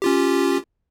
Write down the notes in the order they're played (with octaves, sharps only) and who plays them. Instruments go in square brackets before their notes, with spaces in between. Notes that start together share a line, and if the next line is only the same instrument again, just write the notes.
[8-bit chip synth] C#4 F4 G4